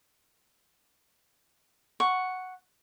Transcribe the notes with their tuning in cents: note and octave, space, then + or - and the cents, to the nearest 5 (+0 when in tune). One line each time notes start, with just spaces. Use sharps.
F#5 +0 C#6 +0